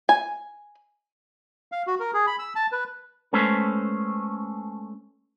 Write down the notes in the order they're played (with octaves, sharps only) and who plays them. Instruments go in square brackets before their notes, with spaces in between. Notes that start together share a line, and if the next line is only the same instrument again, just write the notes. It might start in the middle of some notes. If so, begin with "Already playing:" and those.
[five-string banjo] G#5
[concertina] F5
F#4
A#4
G#4
B5
E6
A5
B4
[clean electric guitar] G#3 A3 C#4 A4 B4 C5